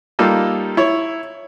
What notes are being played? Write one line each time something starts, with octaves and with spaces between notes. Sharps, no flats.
G3 A#3 D#4 F4 A4
E4 C#5